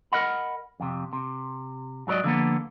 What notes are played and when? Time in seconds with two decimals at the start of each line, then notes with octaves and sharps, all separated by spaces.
0.12 A#4 B4 D#5 F#5 B5
0.80 F2 C3
1.13 C3
2.07 G#2 F#3 A#4 D5 D#5
2.24 D3 F3 A#3 B3